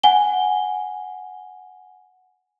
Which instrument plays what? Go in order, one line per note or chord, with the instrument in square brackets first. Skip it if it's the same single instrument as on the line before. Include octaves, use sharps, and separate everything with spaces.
[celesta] F#5 G#5 G7